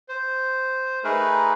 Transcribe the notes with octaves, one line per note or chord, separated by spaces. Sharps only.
C5
A3 D#4 G#4 A#4 B4